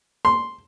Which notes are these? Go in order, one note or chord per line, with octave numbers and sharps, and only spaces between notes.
C6